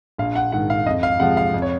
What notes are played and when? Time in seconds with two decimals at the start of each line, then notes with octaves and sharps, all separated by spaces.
0.18 A#1 F5
0.35 F#5
0.52 G#2 D#3 F#5
0.70 F5
0.86 F2 D#5
1.03 F5
1.20 C3 F3 G#3 F#5
1.37 F5
1.54 F2
1.62 C#5